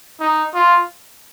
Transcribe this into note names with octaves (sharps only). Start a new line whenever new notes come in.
D#4
F4